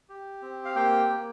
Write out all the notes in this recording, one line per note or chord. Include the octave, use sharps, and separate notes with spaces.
G4
C4
F5
A#3 G4 G5
A#3